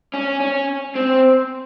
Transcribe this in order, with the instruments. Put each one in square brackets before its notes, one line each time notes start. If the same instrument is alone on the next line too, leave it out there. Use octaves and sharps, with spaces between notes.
[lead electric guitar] C#4
C#4
C4